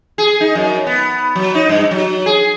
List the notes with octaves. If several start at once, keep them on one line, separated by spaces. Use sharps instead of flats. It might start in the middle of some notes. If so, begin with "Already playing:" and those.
G#4
D#4
F#2
B3
F#3
D#4
G2
F#3
G#4